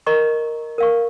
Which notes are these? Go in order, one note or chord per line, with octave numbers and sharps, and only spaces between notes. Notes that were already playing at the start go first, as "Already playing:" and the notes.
A#4 D#5 A#5 C#6
A#4 F5 C#6